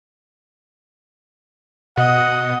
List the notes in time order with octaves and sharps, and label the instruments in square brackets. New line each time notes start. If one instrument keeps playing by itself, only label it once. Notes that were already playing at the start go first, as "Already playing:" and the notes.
[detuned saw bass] B2 [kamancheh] D#5 D#6 [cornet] F#5